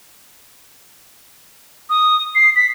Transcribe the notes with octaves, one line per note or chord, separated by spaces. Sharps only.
D#6
C7
B6